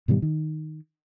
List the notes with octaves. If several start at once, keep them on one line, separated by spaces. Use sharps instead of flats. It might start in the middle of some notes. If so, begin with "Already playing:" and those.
G#2 B2 D#3 G3
D#3